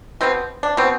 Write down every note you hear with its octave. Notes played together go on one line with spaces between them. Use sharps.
B2 B3 C4
D4
B2 B3 C4